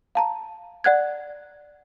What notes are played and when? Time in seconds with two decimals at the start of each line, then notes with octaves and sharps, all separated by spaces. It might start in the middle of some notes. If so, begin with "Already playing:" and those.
0.15 F5 A5 A#5
0.84 D5 F#5 F#6 G#6